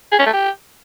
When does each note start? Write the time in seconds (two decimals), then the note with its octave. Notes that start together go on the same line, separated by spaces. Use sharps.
0.12 G#4
0.19 C#4
0.26 A3
0.33 G4